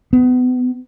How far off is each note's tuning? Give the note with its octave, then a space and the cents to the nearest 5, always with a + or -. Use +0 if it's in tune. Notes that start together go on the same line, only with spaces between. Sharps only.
B3 +30